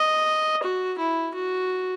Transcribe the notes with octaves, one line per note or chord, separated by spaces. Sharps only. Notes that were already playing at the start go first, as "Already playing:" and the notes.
Already playing: D#5
F#4
E4
F#4